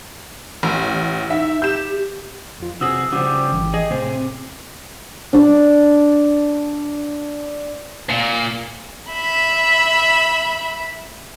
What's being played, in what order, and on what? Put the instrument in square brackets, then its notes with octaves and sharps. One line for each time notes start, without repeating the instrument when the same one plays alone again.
[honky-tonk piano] A1
[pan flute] D#4 [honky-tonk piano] E5
[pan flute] G4 [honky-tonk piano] G6 E7
[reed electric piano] F2 F4
[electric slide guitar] C3 F#4 G#4 [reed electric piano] D#6 E6
[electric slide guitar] C#3 F3 G3 [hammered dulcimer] G4
[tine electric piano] G#1 [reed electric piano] E3
[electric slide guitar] G#4 [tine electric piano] D#5
[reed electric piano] A2 [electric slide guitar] C3 G#4 [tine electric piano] C4
[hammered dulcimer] D4 D5
[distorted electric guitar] A#2
[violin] E5 B5